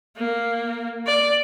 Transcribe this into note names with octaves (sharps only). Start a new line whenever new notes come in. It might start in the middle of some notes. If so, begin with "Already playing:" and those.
A#3
D5